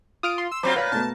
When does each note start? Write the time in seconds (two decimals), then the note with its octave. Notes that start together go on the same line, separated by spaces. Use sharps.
0.23 F4 D#6 F6 D7
0.38 C6
0.51 E6
0.63 F#3 C4 F4 C5 B5 D6
0.76 A#2 B4 C#5 F5
0.92 B2 A3 B3 A5